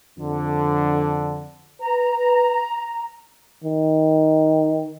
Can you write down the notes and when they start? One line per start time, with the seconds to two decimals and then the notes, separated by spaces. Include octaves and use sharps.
0.19 F2 D3
1.81 B4 A#5
3.64 D#3